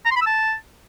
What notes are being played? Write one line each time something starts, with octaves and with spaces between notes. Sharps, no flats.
A#5
C6
B5
E6
A5